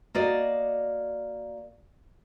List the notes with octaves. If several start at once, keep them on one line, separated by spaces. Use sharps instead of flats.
A#3 F#4 D5 D#5